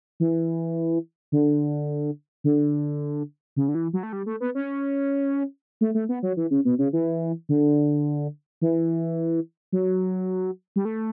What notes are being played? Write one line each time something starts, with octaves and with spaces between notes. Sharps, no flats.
E3
D3
D3
C#3
D3
E3
F#3
A3
G3
A3
B3
C#4
A3
A3
B3
F#3
E3
C#3
B2
C#3
E3
D3
E3
F#3
G3
A3